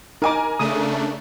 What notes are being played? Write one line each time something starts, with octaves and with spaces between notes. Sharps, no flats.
D#4 A#4 G#5 A#5 D6
C#3 A3 D4 D#6